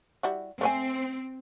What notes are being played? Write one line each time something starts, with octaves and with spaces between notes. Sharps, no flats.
G3 E4 F#4
A3 C4 C5 G#5